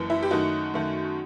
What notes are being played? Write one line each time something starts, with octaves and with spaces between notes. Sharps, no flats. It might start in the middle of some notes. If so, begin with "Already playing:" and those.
Already playing: F#1 F#2 E3
E4
G4
F#2 D#3 A3 D#4 F#4
F#2 D#3 A3